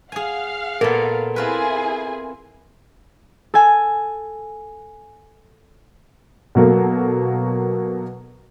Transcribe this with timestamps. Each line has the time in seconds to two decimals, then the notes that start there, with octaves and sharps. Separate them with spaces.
0.12 G#4 F5 F#5 G#5
0.81 A#2 B3 A4 A#4
1.36 C4 E4 F4 G#4 B4 G#5
3.54 A4 G#5
6.55 B2 F#3 A#3 A4